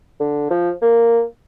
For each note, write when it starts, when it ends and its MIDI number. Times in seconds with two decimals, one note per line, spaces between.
0.20 0.50 50
0.51 0.70 53
0.82 1.22 58